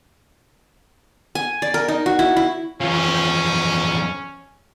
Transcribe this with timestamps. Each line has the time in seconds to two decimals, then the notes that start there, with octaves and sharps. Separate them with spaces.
1.35 G#5
1.62 D5
1.74 A#4
1.88 D#4
2.06 F#4
2.19 E4
2.37 E4
2.81 E2 F3 C#4